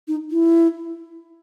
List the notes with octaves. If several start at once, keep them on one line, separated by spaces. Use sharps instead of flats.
D#4
E4